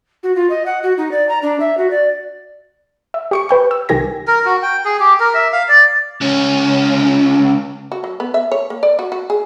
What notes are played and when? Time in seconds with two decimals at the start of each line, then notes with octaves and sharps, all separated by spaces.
0.23 F#4
0.36 F4
0.50 D#5
0.66 F#5
0.83 F#4
0.97 D#4
1.12 D5
1.29 A#5
1.42 D4
1.60 E5
1.78 F#4
1.90 D5
3.14 E5
3.31 G4 C#6 C#7
3.49 B4 G5 C#6
3.71 E6
3.89 C2 D#3 G4 G#5 A#6
4.27 A#4
4.45 F#4
4.62 G5
4.85 G#4
5.00 G4
5.20 A#4
5.34 E5
5.53 F5
5.68 D5
6.21 C#2 C#4
7.92 F#4
8.04 F#3
8.20 B3
8.34 E5
8.51 C#5
8.70 A#3
8.83 D5
8.99 F#4
9.12 F#4
9.30 G#4